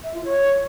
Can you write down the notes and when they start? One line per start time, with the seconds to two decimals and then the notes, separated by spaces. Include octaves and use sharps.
0.03 E5
0.14 F4
0.25 C#5